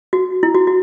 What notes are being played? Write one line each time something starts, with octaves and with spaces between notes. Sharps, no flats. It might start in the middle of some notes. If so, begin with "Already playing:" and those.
F#4
E4
F#4
F#4